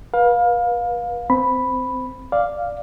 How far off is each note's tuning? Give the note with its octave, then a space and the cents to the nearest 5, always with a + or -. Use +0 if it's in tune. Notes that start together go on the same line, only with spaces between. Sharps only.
B4 -30 F5 +25
C4 -15 B5 +0
D5 +0 F5 +0